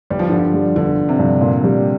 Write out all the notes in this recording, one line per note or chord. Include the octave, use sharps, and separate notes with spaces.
G1 G3
F3
G2 D3
F3
G3
G1 D3
G1
C3
G2
A#2
G3